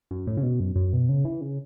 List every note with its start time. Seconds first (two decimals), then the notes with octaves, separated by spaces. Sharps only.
0.11 F#2
0.27 A2
0.37 C#3
0.43 B2
0.60 F#2
0.76 F#2
0.93 B2
1.09 C#3
1.25 E3
1.41 C#3